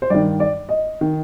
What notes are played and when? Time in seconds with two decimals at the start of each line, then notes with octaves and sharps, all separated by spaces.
0.02 C5
0.10 G2 D#3 D5
0.40 D5
0.69 D#5
1.01 D#3